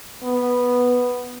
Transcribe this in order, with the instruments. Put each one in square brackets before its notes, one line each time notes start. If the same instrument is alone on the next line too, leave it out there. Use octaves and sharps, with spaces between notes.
[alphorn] B3